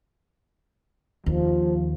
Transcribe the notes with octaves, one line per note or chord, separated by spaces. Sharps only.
D#2 F3